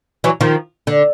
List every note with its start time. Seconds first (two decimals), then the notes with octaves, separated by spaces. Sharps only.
0.24 E3 F#3
0.41 D#3 F3
0.87 D3